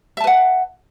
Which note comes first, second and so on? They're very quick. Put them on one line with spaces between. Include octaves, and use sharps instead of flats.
E5 A5 B4 F#5